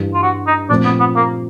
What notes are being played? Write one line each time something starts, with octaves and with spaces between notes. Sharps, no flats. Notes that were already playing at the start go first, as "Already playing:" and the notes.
Already playing: G2 E3 G3
F4
F#4
D#4
A#2 F3 A3 C4 D4
B3
B3
A#3